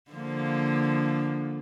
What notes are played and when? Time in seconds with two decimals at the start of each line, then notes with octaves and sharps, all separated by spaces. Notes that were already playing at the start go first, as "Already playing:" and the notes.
0.12 D3 F3 A#3